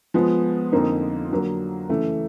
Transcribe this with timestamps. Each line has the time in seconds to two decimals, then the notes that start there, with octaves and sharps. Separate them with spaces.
0.14 F3 G#3 B3
0.72 F2 D3 F3 A#3 D#4
1.31 D3 F#3 A#3
1.89 F#2 C#3 E3 A3